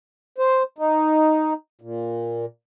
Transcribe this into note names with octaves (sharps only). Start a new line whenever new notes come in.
C5
D#4
A#2